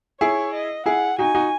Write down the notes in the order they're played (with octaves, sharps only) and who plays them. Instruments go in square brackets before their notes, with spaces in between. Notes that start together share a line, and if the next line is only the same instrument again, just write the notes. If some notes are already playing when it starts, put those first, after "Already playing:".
[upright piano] E4 G#4 [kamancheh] C#5
[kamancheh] D#5
[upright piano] E4 G#4 [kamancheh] F#5
[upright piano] D#4 F#4 [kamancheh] G#5
[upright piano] D#4 F#4